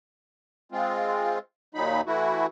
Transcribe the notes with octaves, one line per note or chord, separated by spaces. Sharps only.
G#3 C4 F4
D#2 A#2 F#3 D#4 B5
E3 A3 E4 F#4